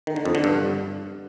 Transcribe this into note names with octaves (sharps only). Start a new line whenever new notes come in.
D#3
D3
F2
D3
G2